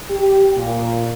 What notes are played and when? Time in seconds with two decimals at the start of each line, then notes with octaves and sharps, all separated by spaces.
0.10 G4
0.56 A#2